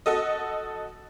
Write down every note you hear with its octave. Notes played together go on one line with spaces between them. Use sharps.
F#4 A4 D#5